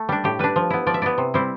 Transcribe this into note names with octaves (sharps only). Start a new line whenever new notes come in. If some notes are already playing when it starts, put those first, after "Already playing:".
Already playing: A3
G3 D4
A2 G4
G3 D4 B4
F3
B3 E4
F3 D5
E5
B3 E4 D5
C3
G3 C4 E4